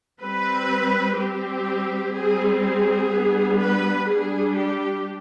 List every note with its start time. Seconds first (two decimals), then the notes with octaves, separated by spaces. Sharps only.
0.21 G3 C4 B4
1.18 G3 C4 G4
2.15 G3 C4 G#4
2.64 G#4
3.11 G3 B3 D4
3.61 B4
4.08 G3 D4 G#4
4.57 G4